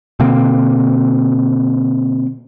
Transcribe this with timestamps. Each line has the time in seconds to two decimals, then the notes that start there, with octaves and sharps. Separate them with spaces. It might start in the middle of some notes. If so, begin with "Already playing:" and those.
0.20 B2 D3 A#3 C4